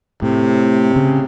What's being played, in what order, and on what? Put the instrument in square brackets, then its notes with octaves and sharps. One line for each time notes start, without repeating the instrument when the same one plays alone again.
[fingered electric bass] A2 [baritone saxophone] C3
[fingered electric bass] C#3